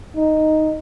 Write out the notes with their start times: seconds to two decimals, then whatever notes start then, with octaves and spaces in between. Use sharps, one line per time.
0.16 D#4